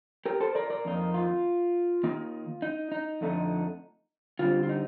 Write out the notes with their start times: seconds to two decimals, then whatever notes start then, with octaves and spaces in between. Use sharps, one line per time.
0.26 G4 A#4
0.40 A4 C5
0.55 A#4 D5
0.70 A#4 D5
0.85 F2 D#3 A#3 D#4
1.14 F4
2.04 D#3 A#3 D#4
2.62 D#4
2.92 D#4
3.21 F2 D3 A3 D#4
4.39 D3 G3 C4 F4
4.63 F4
4.69 D#4